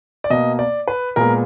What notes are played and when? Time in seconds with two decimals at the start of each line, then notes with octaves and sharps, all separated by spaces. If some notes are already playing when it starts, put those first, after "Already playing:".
0.24 D5
0.30 B2 A#3 D#5
0.59 D5
0.88 B4
1.16 A#2 G#3 B3 A#4